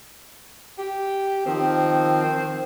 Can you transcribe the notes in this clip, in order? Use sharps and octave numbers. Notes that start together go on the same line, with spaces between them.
G4
D#3 F3 C4